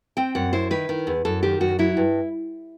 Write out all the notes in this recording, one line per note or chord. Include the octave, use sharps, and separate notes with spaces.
C4 G5
F#2 F#5
E4 C5
D#3 B4
D#3
E2
F#2 A4
D#3 G4
F#2 F#4
F#3 E4
G2